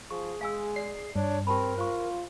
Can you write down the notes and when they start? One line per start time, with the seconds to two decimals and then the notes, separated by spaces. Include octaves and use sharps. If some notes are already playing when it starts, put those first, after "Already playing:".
0.10 F3 G#4 C#6
0.41 G#3 F5 G#5 E6
0.76 D5 C7
1.16 G2 D4 C#5
1.47 C4 G4 A#4 A5 B5
1.78 F4 C5 C#6